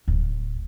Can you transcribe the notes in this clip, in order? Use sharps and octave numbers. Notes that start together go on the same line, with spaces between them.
D1